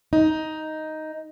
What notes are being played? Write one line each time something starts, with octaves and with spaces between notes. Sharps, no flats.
D#4